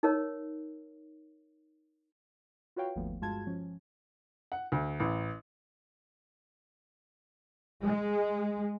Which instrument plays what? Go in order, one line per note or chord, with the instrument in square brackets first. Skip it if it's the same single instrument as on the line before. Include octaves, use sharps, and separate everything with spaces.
[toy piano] D#4 A#4 C#5
[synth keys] F4 F#4 B4 C#5 F5 G5
G1 D#2 F3 A3 B3
G2 G#3 F4 F#4 A5 G#6
F3 C#4
[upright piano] F#5
D2
A1
[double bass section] G#3